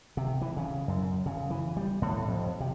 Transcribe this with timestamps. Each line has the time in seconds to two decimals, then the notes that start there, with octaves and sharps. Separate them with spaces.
0.17 C3
0.41 E3
0.57 C#3
0.88 F#2
1.26 C#3
1.50 E3
1.76 G3
2.02 A2
2.28 F2
2.60 C3